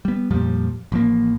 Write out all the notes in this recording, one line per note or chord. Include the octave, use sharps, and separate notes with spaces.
G3 B3
F2 A#2 F3 G3
A1 F3 A#3